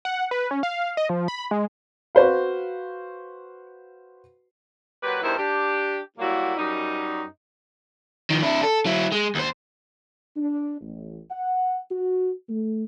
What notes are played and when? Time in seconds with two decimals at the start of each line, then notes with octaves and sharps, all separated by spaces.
0.05 F#5
0.31 B4
0.51 C#4
0.63 F5
0.97 D#5
1.09 F3
1.28 B5
1.51 G#3
2.15 F#4 B4 C5 F5
5.03 A#2 F#3 G4 B4
5.22 E2 G2 D#4 E4 A#4 C5
5.37 D4 G4
6.18 A#2 F#3 G3 A#3 E4 F#4
6.56 F#2 G3 D#4
8.30 D#3 F3
8.42 D4 E4
8.63 A4
8.86 F#3 E4
9.12 G#3
9.35 D#2 C5
10.36 D4
10.81 A1
11.30 F#5
11.91 F#4
12.49 A3